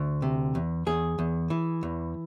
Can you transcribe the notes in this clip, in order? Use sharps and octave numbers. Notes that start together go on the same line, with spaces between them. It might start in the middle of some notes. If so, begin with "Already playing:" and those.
Already playing: D2
C3
E2
E2 G#4
E2
E3
E2